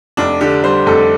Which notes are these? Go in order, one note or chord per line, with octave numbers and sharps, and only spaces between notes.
F1 D4
D3 G4
G3 C5
F1 A4